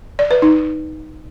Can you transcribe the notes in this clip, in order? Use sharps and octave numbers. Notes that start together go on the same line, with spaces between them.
D5
B4
D#4